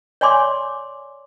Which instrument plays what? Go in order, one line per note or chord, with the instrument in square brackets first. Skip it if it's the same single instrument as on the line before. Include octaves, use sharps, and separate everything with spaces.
[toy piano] C#5 D5 G#5 C6 D6